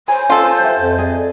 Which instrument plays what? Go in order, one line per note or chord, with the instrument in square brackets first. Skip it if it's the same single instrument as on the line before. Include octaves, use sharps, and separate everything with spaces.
[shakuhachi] C5 [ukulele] C#5 G#5 B5
[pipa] F4 A4
[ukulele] G4 E5
[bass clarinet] F2
[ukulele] G#4 D5 D#5